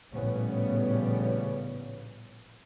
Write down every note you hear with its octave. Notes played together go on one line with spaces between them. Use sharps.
A#1 A2 C#3 G3 B3 C#4